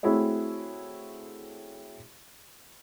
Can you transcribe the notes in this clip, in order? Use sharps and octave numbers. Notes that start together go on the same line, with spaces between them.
A3 C4 E4 F#4 G#4 C#5